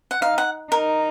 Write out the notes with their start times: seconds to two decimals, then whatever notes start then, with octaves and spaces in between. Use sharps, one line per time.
0.11 F#5
0.22 D#4 F5
0.38 F#5
0.71 D#4 A#4